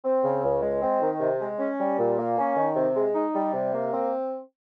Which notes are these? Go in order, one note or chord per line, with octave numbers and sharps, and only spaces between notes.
C4
C#3
C#2
G#3
C4
D#3
C3
G#3
C#4
G3
A#2
A#3
C#4
D#3
C3
G#3
D#4
G3
C3
A#3
C4